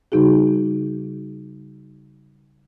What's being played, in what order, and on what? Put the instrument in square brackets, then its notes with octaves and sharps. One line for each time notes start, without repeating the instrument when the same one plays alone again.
[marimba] C#3 G3 D#4 F#4 G#4